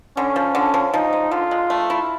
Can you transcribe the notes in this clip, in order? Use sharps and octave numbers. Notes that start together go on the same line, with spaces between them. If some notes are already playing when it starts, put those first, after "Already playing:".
D3 C#4
F3
D3
F3
F3 D#4
G#3
D3 F4
G#3
A3
E4